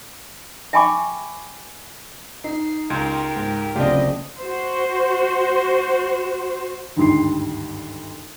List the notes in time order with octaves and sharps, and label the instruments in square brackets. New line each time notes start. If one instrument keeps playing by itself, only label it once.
[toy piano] E5 G5 G#5 B5 C#6 D6
[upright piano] D#4 [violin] C7
[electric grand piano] C#2 D#4 [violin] G4 A#4 [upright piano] C6
[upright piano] G#2
[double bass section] F#1 C#3 C4 [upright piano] D2 [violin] D4 D#5 [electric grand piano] F4 G4
[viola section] F#4 C5
[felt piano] G#1 D2 G2 G3 C6 C7